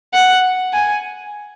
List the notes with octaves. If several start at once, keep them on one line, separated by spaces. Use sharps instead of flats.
F#5
G#5